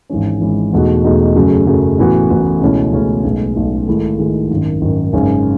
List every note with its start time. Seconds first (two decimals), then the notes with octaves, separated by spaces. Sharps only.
0.10 G#1 G#2 E3 G#3 C#4
0.40 G#1 G#2 E3 G#3 C#4
0.73 E2 B2 A3 D#4 F#4
1.04 E2 B2 A3 D#4 F#4
1.36 F#2 C#3 F#3 A3
1.67 F#2 C#3 F#3 A3
1.98 A1 A2 E3 B3 F#4
2.29 A1 A2 E3 B3 F#4
2.61 C#2 B2 A3 C#4 E4
2.92 C#2 B2 A3 C#4 E4
3.24 B1 A2 G#3 B3
3.56 B1 A2 G#3 B3
3.87 G#2 D#3 A3 E4 G#4
4.19 G#2 D#3 A3 E4 G#4
4.51 G#1 F#2 D#3
4.82 G#1 F#2 D#3
5.13 G#1 F#2 C#3 G#3 C#4